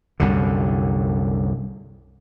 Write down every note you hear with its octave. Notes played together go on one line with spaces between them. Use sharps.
C2 F#2 D3